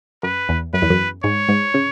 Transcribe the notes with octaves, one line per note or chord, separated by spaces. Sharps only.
F#2 B4
E2
F#2 B4
E2
F#2
G#2 C#5
G#2
C#3